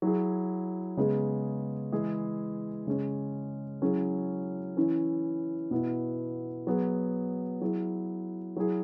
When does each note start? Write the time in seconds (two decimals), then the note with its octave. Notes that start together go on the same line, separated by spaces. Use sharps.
0.02 F#3 E4 G#4
0.97 C#3 G#3 B3 G#4
1.92 E3 G#3 E4 G#4
2.87 C#3 G#3 C#4
3.82 F#3 C#4 E4 G#4
4.77 E3 C#4 E4
5.71 B2 B3 E4
6.67 F#3 B3 G#4
7.61 F#3 E4 G#4
8.56 F#3 E4 G#4